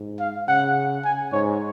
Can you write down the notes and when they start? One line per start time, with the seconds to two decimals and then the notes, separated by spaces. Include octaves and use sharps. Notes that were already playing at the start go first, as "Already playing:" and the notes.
Already playing: G#2
0.20 F5
0.48 C#3 F#5
1.05 G#5
1.32 G#2 C#5